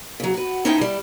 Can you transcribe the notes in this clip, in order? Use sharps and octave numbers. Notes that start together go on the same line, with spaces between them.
C#3 F#3
F#4 B4
C#4 D#4 E4 A4 D#5 G5
G3 E4